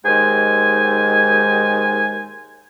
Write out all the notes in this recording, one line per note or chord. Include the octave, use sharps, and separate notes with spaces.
D#2 G#2 G#3 G5 G#5